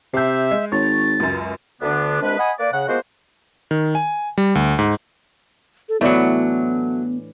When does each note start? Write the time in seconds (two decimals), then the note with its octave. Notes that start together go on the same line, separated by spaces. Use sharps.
0.14 C3 E5 G6 C7
0.51 G#3
0.72 G#1 C#5 A6
1.20 C#2 F#2
1.81 D2 D3 B3 D4
2.22 C2 C3 G#3 D4 B4
2.38 D#5 F#5 G#5 B5 D#6
2.60 A#3 B4 D5
2.73 C#3 F#5
2.88 G#3 A#3 B3 F4 F#4 C5
3.71 D#3
3.95 G#5
4.38 G3
4.55 D2
4.79 G#2
5.89 A4
6.01 A2 E3 F#3 A3 B3 D4